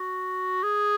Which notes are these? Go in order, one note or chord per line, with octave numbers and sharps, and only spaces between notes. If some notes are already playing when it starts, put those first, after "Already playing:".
Already playing: F#4
G#4